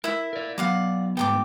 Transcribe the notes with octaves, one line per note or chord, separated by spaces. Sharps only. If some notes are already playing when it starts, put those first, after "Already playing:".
E4 A#4 E5
A#4 D5
F#3 B3 D5 F5 F#5
G#2 G3 B3 G5 A5 D6